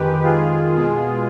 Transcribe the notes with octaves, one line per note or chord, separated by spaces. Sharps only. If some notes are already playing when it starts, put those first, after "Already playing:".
Already playing: F2 D#3 G#3 G4 B4
F4 G#4
B2 G#3